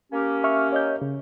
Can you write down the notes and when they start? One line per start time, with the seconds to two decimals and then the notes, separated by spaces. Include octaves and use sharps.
0.12 A#3 C#4 G4
0.44 E5 C#6 F6
0.72 C#5 D#5 G6
1.02 C#3